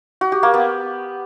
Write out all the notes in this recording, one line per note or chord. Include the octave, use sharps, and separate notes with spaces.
F#4
G4
A#3
B3